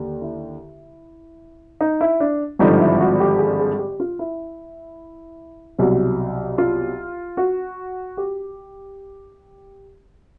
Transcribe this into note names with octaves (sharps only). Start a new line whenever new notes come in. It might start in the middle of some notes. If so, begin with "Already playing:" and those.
Already playing: D#2 D3
E4
D#4
E4
D4
G#1 G2 D3 F3 D#4
E4
F#4
G4
G#4
G#4
G4
F4
E4
C2 B2 F#3
F4
F#4
G4